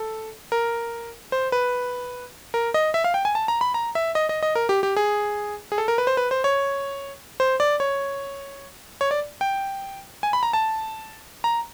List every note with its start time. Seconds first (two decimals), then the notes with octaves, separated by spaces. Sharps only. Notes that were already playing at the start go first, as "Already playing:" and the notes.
Already playing: A4
0.52 A#4
1.32 C5
1.52 B4
2.54 A#4
2.74 D#5
2.94 E5
3.04 F5
3.14 G5
3.25 G#5
3.35 A5
3.48 A#5
3.61 B5
3.74 A#5
3.95 E5
4.15 D#5
4.29 D#5
4.43 D#5
4.55 A#4
4.69 G4
4.83 G4
4.97 G#4
5.72 G#4
5.78 A4
5.88 A#4
5.98 B4
6.07 C5
6.17 B4
6.31 C5
6.44 C#5
7.40 C5
7.60 D5
7.80 C#5
9.01 C#5
9.11 D5
9.41 G5
10.23 G#5
10.33 B5
10.43 A#5
10.53 A5
11.44 A#5